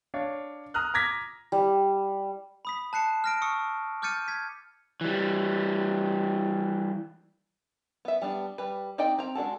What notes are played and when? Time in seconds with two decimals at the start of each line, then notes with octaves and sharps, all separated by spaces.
0.14 D4 C#5 F5
0.74 A#5 D#6 F6 F#6
0.94 A#5 D6 G#6 A#6 B6
1.52 G3
2.65 B5 D#6 B6
2.93 A5 F#6 C7 C#7 E7
3.24 F6 A#6 D7
3.42 C#6 D#6 E6 C#7
4.02 D6 F6 G6 A6 C#7 D#7
4.28 G#6 B6
5.01 E3 G3
8.05 B3 E5
8.22 G3 B3 D4
8.58 G3 B4
8.98 C4 D#4 D5 D#5 G5
9.18 C4 A#5
9.35 G#3 D4 F#4 A4